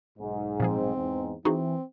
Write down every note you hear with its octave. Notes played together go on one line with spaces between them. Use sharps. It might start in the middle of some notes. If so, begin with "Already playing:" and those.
B1 G#2
A#2 F3 C4 G#4
E2 G#2
E3 C4 D#4 F#4 G#4